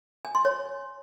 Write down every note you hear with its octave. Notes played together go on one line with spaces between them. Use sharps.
G#5
C6
C#5